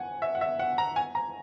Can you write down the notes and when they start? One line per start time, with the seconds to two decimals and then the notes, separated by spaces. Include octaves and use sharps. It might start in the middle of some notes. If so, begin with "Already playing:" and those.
Already playing: F#5 G#5
0.22 E5
0.35 F#5
0.41 E5
0.59 F#5
0.78 A#5
0.96 G#5
1.15 A#5